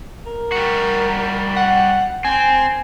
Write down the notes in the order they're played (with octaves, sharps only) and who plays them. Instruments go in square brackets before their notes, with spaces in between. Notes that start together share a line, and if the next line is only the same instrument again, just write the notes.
[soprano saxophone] A#4
[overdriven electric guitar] G3 F#4
[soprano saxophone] F#5
[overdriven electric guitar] C4 [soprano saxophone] G#5